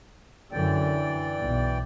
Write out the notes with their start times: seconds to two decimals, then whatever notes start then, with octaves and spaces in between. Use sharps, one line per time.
0.52 F#2 D3 E3 D5 G5
1.41 B1